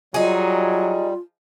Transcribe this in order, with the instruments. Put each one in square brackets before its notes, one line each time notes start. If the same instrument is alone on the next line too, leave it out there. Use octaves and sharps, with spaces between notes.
[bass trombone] F#3 [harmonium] G3 [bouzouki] D#4 G#4 [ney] F4